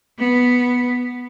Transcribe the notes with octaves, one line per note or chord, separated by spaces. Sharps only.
B3